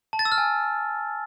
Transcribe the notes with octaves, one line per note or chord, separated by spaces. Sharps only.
A5
A6
E6
F6
G#5